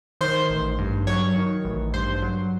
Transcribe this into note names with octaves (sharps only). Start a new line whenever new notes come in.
D#3 C5 C6
A1
G2
F#3 C#5 C#6
D#3
A1
G2 C5 C6
F#3